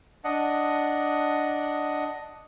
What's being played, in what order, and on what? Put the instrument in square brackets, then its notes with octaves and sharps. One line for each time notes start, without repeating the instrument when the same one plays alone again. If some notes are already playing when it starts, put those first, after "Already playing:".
[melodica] D4 D#5 F#5